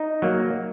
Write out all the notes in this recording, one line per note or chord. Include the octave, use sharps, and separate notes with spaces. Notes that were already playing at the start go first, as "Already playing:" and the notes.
Already playing: D#4
F#3 A#3